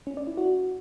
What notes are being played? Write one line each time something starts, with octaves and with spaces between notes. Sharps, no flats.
C#4
D5
E4
F#4